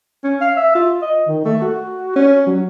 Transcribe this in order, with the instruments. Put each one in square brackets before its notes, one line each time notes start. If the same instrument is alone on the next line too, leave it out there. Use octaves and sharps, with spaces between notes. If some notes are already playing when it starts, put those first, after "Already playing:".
[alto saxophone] C#4
F5
E5
F4
D#5
D#3
A3
F#4
C#4
F#3